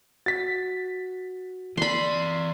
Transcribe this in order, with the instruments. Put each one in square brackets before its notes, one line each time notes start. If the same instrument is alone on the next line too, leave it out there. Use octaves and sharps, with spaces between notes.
[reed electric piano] F#4 [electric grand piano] A6 B6
[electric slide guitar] E3 D5 [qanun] B5 C6